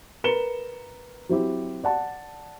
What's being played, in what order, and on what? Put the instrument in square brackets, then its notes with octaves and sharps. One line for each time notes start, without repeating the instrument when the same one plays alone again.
[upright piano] A#4 B4 C#7 E7 G7
F#3 C4 E4 G4
D5 F#5 A5